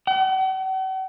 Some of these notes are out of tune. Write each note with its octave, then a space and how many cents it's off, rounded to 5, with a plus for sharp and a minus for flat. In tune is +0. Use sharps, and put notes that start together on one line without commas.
F#5 +45